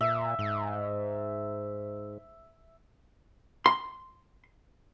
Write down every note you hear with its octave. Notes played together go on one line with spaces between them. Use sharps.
A#2 E5
G#2
C6